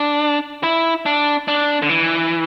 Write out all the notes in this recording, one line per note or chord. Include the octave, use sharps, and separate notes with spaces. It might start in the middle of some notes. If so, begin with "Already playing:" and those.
Already playing: D4
E4
D4
D4
D3
E3